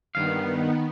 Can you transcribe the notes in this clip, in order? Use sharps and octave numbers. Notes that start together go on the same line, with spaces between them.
G2 D#3 B3 F5